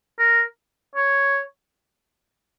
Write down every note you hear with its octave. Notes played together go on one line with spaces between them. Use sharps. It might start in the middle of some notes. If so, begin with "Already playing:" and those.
A#4
C#5